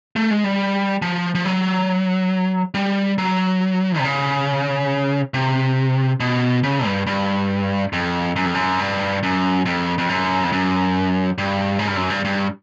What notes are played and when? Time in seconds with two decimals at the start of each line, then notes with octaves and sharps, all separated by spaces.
0.16 A3
0.31 G#3
0.44 G3
1.02 F3
1.35 F3
1.45 F#3
2.74 G3
3.18 F#3
3.99 C3
4.04 C#3
5.34 C3
6.20 B2
6.63 C#3
6.85 G2
7.07 G2
7.93 F2
8.36 F#2
8.46 F2
8.54 F#2
8.79 G2
9.23 F#2
9.65 F2
9.98 F2
10.09 F#2
10.44 F2
10.52 F#2
11.38 G2
11.79 G#2
11.88 G2
11.96 F#2
12.10 G2
12.25 G2